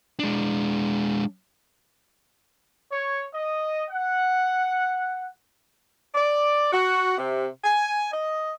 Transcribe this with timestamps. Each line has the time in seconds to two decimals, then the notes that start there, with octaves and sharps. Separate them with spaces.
0.19 G#3 D4
2.92 C#5
3.34 D#5
3.91 F#5
6.15 D5
6.73 F#4
7.18 C3
7.64 G#5
8.12 D#5